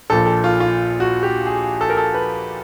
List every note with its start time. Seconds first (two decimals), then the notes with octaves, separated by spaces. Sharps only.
0.10 A#1 A#2 F3 A4
0.26 A4
0.44 F4
0.60 F4
1.00 F#4
1.23 G4
1.46 G#4
1.81 A4
1.90 A#4
1.97 A4
2.14 B4